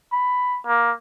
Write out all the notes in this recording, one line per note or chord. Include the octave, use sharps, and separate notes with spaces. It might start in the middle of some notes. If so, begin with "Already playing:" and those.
B5
A#3